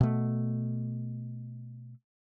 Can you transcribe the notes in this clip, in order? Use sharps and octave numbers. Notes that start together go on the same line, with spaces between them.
B2 A3